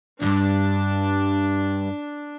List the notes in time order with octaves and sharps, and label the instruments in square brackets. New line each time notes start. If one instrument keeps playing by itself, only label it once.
[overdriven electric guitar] D2 G2 [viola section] D4